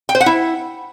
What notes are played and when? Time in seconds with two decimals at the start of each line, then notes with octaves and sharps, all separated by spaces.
0.09 G5
0.15 C5
0.20 F#5
0.26 E4